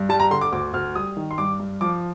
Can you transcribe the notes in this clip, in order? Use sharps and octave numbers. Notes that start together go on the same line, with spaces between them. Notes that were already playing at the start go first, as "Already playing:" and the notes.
Already playing: G2
G3 A5
A#5
D3 C6
D6
D2 D6
D2 F6
G3 D#6
D#3
C6
G2 D6
G2
F3 D6